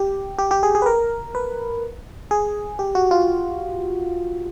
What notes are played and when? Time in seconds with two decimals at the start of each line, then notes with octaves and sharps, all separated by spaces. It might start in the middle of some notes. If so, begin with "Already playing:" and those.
Already playing: G4
0.39 G4
0.51 G4
0.63 G#4
0.75 G#4
0.82 B4
0.86 A#4
1.35 B4
2.31 G#4
2.79 G4
2.95 F#4
3.11 F4